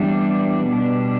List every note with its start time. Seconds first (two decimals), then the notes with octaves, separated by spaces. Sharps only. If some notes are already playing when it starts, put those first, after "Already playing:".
Already playing: E3 G3 B3 D4
0.71 B2 G3 D4